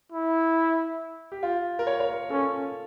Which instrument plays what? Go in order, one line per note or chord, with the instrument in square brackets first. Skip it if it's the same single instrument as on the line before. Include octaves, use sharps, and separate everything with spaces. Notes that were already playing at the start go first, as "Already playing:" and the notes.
[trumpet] E4
[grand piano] G4
F4
A#4
C#5
C#5
A#4
[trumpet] C#4 [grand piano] A4